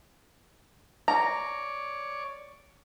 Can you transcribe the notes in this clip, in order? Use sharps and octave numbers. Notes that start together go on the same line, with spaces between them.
C#5 D5 A#5